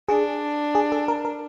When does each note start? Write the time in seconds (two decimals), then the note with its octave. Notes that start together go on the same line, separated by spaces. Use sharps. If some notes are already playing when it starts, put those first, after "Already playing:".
0.08 D4 G#4
0.75 G#4
0.92 A4
1.08 A#4
1.25 A#4